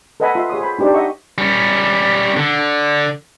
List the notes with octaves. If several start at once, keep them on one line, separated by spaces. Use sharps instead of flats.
A4 B4 D#5 F#5 G#5 B5
F4 E5 C6
G#4 C#5 C6 D#6
C5 B5
D4 D#4 G4 C5 D5
D#5 E5 F#5 C#6
G3 C#4
D3